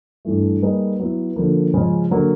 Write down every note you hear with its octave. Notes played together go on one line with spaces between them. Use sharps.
G2 E3 A3
G3 A#3 D#4 G#4 B4
F#3 B3 E4
D3 F3 A#3
C#3 F3 G#3 C#4
D3 F#3 A#3